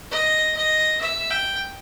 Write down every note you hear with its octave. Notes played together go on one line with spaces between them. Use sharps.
D#5
D#5
E5
G5